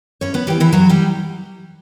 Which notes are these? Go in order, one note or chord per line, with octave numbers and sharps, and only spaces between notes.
G2 C#4 C#5
B3 B4
E3 G3 B3 G4
E3 E4
G2 F#3 F#4
G3 G4